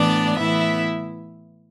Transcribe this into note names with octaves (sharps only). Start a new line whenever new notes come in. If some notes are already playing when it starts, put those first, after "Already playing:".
Already playing: A2 E3 B3 D4 D5
A2 E3 B3 E4 E5